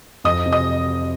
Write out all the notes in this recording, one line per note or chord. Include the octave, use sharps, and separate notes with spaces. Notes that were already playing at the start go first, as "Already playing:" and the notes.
F2 D#5 D#6
C3
D#5 D#6